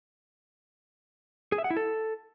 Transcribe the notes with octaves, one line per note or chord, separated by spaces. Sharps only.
G#4
E5
F#5
E4
A4